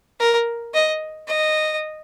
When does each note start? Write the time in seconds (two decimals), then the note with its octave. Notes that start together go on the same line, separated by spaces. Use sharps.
0.20 A#4
0.74 D#5
1.28 D#5